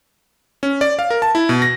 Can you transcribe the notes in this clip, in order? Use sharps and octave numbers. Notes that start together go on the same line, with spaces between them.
C#4
D5
F5
A#4
A5
E4
B2
A#6